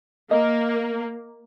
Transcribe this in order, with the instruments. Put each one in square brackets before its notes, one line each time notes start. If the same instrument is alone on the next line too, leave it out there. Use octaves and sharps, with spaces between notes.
[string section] A#3 [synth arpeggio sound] D#5